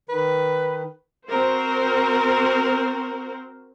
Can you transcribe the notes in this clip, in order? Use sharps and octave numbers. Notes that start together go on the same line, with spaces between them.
D#3 B4
C4 F#4 A#4 C5